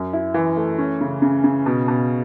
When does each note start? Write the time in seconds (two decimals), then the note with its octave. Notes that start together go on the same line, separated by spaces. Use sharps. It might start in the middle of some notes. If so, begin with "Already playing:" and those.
Already playing: F#2
0.13 E4
0.34 E3
0.57 A3
0.79 C#4
1.01 C#3
1.22 C#3
1.44 C#3
1.66 B2
1.88 B2